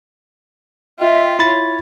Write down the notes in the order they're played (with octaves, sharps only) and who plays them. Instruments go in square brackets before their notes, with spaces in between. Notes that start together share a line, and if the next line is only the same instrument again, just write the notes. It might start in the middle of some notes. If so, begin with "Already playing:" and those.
[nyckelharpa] F4 [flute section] D#5 E5 G5
[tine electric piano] E4 B5 A6 [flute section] C#5